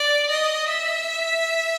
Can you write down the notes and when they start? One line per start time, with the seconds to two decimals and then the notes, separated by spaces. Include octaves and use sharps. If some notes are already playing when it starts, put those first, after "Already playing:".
Already playing: D5
0.30 D#5
0.69 E5